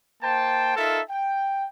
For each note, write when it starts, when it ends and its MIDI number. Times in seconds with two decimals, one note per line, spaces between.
0.23 0.74 58
0.23 0.74 72
0.23 0.74 79
0.23 0.74 81
0.77 1.00 63
0.77 1.00 65
0.77 1.00 69
0.77 1.00 70
0.77 1.00 76
1.09 1.67 79